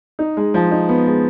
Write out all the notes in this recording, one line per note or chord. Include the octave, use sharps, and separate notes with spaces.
D#4
G#3
F3
D#4
B3
G#3